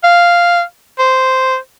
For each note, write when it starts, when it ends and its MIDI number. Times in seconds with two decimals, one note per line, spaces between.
0.04 0.62 77
0.99 1.57 72